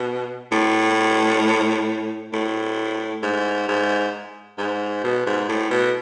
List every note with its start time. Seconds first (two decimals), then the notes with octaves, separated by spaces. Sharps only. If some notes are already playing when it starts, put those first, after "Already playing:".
Already playing: B2
0.52 A2
2.33 A2
3.23 G#2
3.68 G#2
4.58 G#2
5.04 B2
5.26 G#2
5.49 A2
5.71 B2